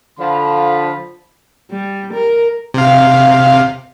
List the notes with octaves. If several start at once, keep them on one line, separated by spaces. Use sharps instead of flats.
D3 F3 B5
G3
A#4
C3 F5